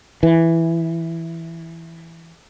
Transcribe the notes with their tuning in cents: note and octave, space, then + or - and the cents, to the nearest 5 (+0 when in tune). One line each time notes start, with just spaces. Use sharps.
E3 +5